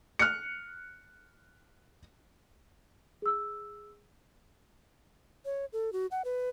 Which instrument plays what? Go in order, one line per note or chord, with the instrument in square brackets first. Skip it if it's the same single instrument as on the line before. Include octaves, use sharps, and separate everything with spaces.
[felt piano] F6 F#6 C#7
[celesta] G#4 E6
[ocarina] C#5
A4
F#4
F#5
B4